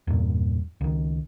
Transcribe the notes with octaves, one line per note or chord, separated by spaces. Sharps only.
E2 G2 A#2
C#2 D#3